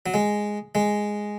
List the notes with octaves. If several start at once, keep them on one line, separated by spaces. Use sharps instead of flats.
F#3
G#3
G#3